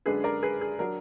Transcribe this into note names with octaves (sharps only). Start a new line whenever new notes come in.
F#2 D3 G#3 D4 G#4 B4
A#4 D5
G#4 B4
G#4
F#3 D4 A#4